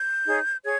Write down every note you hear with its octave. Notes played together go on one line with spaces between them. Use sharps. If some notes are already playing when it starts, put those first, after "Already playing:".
Already playing: G6
D#4 G#4 C#5
G#4 C#5 G#6